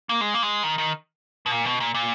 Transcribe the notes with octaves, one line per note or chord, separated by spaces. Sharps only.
A#3
G#3
A#3
G#3
D#3
D#3
B2
A#2
B2
A#2
A#2